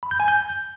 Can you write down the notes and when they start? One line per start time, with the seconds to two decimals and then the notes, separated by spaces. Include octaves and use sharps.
0.03 B5
0.11 G6
0.20 G#5
0.28 G6